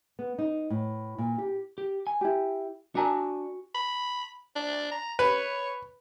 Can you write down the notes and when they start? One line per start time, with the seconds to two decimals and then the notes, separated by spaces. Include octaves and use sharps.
0.19 B3
0.38 D#4
0.70 A2
1.18 A#2
1.38 G4
1.78 G4
2.07 G#5
2.21 E4 G4
2.95 D4 F#4 A#4 G#5 A5
3.75 B5
4.56 D4
4.91 A#5
5.19 B4 C#5